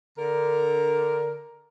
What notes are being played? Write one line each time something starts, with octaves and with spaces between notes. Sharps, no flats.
D3 A#4